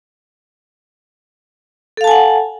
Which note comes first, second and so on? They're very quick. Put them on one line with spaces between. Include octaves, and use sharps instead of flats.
A4 F5 A5 G#5 F#5